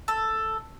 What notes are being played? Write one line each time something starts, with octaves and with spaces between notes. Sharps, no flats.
A4